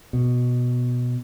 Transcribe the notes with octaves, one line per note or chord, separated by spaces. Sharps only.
B2